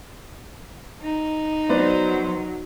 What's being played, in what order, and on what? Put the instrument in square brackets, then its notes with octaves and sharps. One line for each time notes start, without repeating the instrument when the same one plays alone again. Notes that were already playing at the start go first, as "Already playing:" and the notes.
[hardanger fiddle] D#4
[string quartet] F#3 [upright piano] B3 B4 D5 [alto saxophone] C5